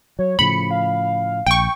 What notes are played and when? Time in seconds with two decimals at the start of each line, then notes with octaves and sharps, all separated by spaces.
0.19 F#3 C#5
0.39 A2 C#3 F3 B5 C#7
0.71 F5
1.47 A#1 G5 C#6